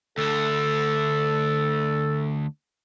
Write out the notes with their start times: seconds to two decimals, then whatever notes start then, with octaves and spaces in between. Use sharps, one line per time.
0.18 D2 D3 A4